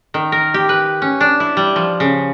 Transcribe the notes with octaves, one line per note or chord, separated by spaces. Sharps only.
D#3
A#4
G4
B4
C#4
D4
E4
G3
F3
C#3